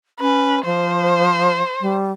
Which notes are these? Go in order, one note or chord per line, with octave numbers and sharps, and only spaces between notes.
C#4 B4
F3 C5
G3